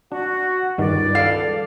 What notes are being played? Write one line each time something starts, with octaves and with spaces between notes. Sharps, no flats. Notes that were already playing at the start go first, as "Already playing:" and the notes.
D4 F#4
C#2 G2 D#3 G3 D5
A4 F5